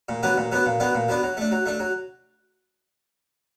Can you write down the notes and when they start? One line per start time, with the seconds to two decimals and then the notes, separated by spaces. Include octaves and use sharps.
0.09 A#2
0.23 F#3 B3 D4
0.37 A#2
0.52 F#3 B3 D4
0.66 A#2
0.80 F#3 B3 D4
0.95 A#2
1.09 F#3 B3 D4
1.23 F#3
1.37 A3 D4
1.51 F#3
1.66 A3 D4
1.80 F#3